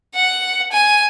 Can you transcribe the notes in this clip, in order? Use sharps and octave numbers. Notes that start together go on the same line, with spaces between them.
F#5
G#5